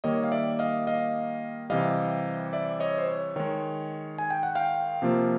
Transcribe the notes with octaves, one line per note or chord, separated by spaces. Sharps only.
D#3 G3 A#3 C#5 D#5
F5
D5 E5
D#5 F5
D#5 F5
C3 E3 G3 D#5 F5
D5 E5
C#5 D#5
C5
C#5
D#3 G#3 C#5
G#5
G5
F#5
F5 G5
C3 F3 A#3